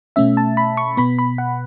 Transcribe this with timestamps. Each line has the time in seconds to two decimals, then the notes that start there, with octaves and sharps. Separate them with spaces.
0.16 B2 A3 C#4 E5
0.37 A5
0.57 B5
0.77 C#6
0.97 B2 B3 B5
1.19 B5
1.38 F#5